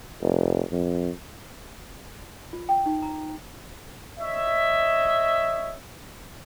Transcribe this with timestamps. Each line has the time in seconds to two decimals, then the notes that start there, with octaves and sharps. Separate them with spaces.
0.22 F1
0.72 F2
2.53 F4
2.69 G5
2.86 D#4
3.02 A#5
4.19 C#5 D#5 E5